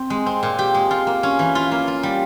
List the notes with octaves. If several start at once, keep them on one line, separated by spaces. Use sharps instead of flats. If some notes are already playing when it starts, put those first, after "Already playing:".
Already playing: C4
G#3
C4
A#2
G4
G#3
F4
A#3
C#4
E3
F4
A#3
F4
G3